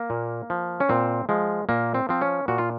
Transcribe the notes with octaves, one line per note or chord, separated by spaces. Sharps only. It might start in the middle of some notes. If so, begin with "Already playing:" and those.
Already playing: A#3
A#2
F3
C#4
A#2 C4
F3 G#3
A#2 A#3
C4
F3 C4
C#4
A#2 F#4
F4